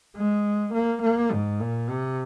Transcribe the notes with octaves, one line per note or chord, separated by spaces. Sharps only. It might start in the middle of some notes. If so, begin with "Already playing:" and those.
G#3
A#3
A#3
G#2
A#2
C3